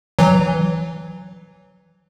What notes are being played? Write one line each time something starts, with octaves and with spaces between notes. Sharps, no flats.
E3 F#3